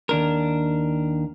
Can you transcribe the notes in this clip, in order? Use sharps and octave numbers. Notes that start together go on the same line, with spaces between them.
D#2 D4 A#4